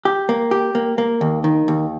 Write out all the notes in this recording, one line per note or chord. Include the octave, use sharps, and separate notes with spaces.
G4
A#3
G4
A#3
A#3
D#2
D#3
D#2